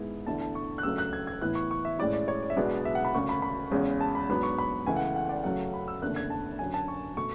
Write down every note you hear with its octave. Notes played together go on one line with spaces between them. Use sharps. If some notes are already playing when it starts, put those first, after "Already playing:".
Already playing: G#2 G#3 B3 E4
E2 D3 A3 E4 A5
A5
C#6
F#6
C#2 C#3 F#3 A3 D4 E6
F#6
G#6
G#6
A2 E3 B3 E4 F#6
C#6
C#6
E5
A2 G#3 C#4 E4 D5
D5
C#5
D5
E5
B1 B2 G#3 B3 D4 D5
E5
F#5
B5
E1 D2 C#3 C#6
B5
B5
E2 C#3 G#3 C#4
A5
B5
G#2 F#3 B3 D4 B5
C#6
B5
C#2 C#3 E3 A3 E4 G#5
F#5
F#5
D5
F#2 C#3 F#3 A3 F#5
B5
E6
F#1 E2 D3 A3 F#6
G#6
A5
F#2 D3 F#3 G#5
A5
C#6
B2 A3 C#6